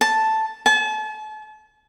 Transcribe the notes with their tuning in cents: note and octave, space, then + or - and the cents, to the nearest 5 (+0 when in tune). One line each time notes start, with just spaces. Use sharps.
A5 +0
A5 -40